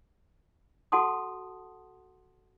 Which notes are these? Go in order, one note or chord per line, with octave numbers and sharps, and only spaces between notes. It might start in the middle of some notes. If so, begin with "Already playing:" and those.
F#4 A4 F#5 A5 C6 D#6